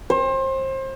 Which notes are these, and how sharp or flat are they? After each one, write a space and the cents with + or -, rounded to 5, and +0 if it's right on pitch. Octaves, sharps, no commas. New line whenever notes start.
C5 +30